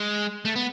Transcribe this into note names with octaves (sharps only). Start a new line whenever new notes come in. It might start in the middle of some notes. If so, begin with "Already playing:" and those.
Already playing: G#3
A3
B3